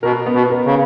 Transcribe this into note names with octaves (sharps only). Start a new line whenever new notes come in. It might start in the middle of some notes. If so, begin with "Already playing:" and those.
B2 A#4
B3
B2
A#4
C#3